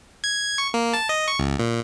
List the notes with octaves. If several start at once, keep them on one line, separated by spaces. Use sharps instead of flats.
G#6
C#6
A#3
A5
D#5
C#6
C#2
A#2